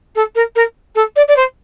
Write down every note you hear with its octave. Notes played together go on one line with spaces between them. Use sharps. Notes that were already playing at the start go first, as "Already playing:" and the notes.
A4
A#4
A#4
A4
D5
D5
C5